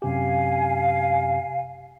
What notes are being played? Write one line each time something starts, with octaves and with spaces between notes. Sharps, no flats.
F#2 C3 G4 F5 G#5